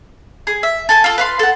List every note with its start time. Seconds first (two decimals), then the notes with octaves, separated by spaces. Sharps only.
0.47 G#4
0.63 E5
0.89 A4 G#5 A5
1.04 F4 A4
1.18 B4 F5 C6
1.39 A4 F#5